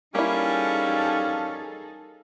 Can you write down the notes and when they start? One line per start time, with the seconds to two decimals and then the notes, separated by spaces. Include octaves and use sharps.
0.15 G3 A#3 C#4 D#4 E4 G#4 A4 F5